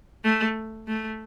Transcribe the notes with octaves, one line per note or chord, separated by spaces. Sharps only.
A3
A3